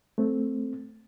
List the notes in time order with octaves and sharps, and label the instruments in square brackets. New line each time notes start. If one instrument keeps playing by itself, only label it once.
[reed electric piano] A3 C4